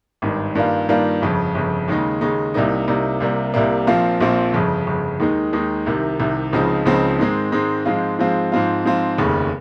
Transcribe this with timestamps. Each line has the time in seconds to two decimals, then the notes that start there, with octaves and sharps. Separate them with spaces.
0.22 G#1 G2 D#3
0.55 G2 D#3 G3 A#3 F4
0.89 G2 D#3 G3 A#3 F4
1.22 G1 F2 C#3
1.55 G1 F2 C#3
1.88 D#2 C#3 G#3 D#4
2.21 D#2 C#3 G#3 D#4
2.54 C2 C3 G3 A#3 D#4
2.88 C2 C3 G3 A#3 D#4
3.20 C2 C3 G3 A#3
3.54 C2 C3 G3 A#3
3.87 A#1 A#2 F3 C4 F4
4.20 A#1 A#2 F3 C4 F4
4.54 G1 F2 C#3
4.87 G1 F2 C#3
5.20 D#2 D#3 G#3 D#4
5.53 D#2 D#3 G#3 D#4
5.86 C2 C3 D#3
6.19 C2 C3 D#3
6.53 C#2 C#3 F3 C4 D#4
6.85 C#2 C#3 F3 C4 D#4
7.19 G#2 D#3 G#3 C4 D#4
7.52 G#2 D#3 G#3 C4 D#4
7.86 G#2 F3 G#3 C4 F4
8.18 G#2 F3 G#3 C4 F4
8.52 G#2 F3 C4 F4
8.85 G#2 F3 C4 F4
9.18 F1 D#2 C#3